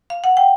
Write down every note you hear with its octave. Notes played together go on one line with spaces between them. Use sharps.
F5
F#5
G5